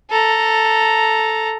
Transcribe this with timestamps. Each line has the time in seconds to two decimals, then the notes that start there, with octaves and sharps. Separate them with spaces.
0.11 A4 A#5